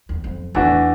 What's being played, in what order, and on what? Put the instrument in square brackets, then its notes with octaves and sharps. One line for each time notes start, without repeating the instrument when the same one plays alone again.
[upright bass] E2
F2
[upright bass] E2 [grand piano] E3 A3 D4 F#4